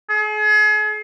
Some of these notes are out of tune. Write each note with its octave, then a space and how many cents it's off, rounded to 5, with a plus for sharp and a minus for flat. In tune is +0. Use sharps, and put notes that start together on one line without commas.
G#4 +40